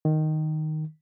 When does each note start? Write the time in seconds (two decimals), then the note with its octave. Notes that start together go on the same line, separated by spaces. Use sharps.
0.05 D#3